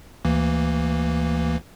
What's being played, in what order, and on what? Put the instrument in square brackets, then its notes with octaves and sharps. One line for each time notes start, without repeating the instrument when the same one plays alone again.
[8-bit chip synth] D2 E3 A#3